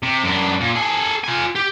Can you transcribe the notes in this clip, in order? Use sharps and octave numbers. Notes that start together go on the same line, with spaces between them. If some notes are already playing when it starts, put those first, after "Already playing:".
C3
F#2 D4
A#2
G#4 A4
F4 G#5
G4